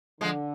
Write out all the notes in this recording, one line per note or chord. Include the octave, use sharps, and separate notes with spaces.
D3 F3 G#3